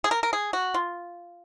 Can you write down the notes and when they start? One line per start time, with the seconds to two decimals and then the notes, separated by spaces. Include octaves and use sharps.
0.04 G#4
0.11 A#4
0.23 A#4
0.33 G#4
0.53 F#4
0.74 F4